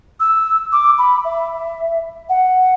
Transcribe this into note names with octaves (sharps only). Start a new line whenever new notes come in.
E6
D6
B5
E5
F#5